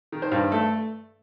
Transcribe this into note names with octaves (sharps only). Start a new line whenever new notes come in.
D#3
C5
G2
A3 A4